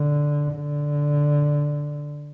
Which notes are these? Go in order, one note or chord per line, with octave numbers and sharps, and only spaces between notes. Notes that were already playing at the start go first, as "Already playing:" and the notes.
Already playing: D3
D3